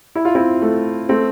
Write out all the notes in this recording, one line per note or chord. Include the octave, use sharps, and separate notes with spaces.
E4
F4
C4 E4
A3
A3 C4